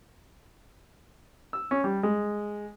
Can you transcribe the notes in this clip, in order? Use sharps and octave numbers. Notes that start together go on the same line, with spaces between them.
E6
C#4
G3
G#3